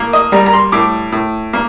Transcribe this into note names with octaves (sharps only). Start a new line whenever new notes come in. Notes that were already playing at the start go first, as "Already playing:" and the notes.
Already playing: A2 A#3
D#5
G3 A#5
A#5
C6
A2 D6
A2
A#3